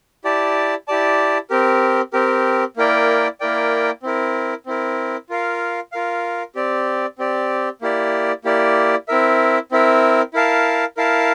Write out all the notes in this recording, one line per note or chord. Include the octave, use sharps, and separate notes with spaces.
E4 G4 D5 A5
E4 G4 D5 A5
C4 G4 A#4
C4 G4 A#4
A#3 E4 A#4 D5 G5
A#3 E4 A#4 D5 G5
C4 E4 A#4
C4 E4 A#4
F4 A#4 F5
F4 A#4 F5
C4 G4 D5
C4 G4 D5
A#3 E4 G4 D5
A#3 E4 G4 D5
C4 E4 A#4 E5
C4 E4 A#4 E5
E4 A#4 F5 A5
E4 A#4 F5 A5